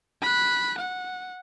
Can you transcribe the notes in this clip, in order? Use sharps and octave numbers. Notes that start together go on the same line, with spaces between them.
B5 F#6
F#5